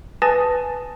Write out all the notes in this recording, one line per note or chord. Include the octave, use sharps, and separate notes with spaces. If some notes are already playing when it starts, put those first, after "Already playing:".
B4 G#5 A5 D#6 A6 A#6